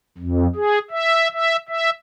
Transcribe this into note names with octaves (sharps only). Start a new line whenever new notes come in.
F2
G#4
E5
E5
E5